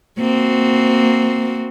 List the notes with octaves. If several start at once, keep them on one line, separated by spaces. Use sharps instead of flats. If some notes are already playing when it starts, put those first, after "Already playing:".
A#3 C4 F#4